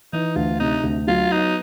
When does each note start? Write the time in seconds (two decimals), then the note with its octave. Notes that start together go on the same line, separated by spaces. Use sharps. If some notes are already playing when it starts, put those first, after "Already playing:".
0.13 E3 D#4
0.36 D2 F4
0.60 C3 D#4
0.83 D2
1.07 F#3 F4
1.32 B3 D#4